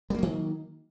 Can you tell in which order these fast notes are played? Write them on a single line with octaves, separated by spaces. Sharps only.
G3 A#3 F#3 D#3